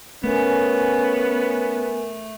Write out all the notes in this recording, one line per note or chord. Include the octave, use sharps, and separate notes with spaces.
A3 B3 C#4 A#4 G#5